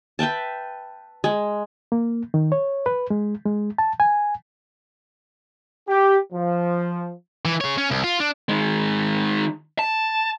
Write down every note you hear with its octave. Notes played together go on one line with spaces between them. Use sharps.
B4 E5 G5 A5
G#3
A#3
D#3
C#5
B4
G#3
G#3
A5
G#5
G4
F3
E3
G#4 C#5
C#4
C2
F4
D4
D#3 G#3
A5